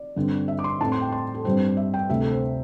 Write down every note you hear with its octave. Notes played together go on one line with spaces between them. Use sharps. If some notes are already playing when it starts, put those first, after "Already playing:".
Already playing: D5
G2 D3 C4
E5
D6
C6
A2 A3 C4 A5
C6
G5
C6
A4
G2 G3 C4 C5
E5
G5
D2 C3 A3 C4 E5
A4
C5